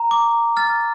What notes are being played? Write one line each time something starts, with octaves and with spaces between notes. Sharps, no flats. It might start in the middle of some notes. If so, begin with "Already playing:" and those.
Already playing: A#5
D6
F6 A6